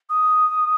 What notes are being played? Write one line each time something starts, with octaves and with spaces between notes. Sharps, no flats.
D#6